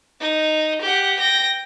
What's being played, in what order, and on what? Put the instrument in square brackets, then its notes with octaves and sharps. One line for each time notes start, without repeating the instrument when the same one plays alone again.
[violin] D#4
G4 F#5
G5 A#6